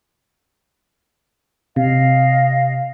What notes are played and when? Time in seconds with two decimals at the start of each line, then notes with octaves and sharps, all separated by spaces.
1.76 C3 D#5 F5